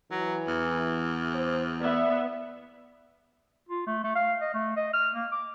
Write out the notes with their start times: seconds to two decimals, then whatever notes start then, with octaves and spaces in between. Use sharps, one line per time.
0.11 E3 F#3
0.48 E2
1.34 C5
1.80 B3 D5 E5
3.69 F4
3.87 A3
4.04 A3
4.15 F5
4.41 D#5
4.54 A3
4.77 D#5
4.93 F6
5.15 A#3
5.32 D6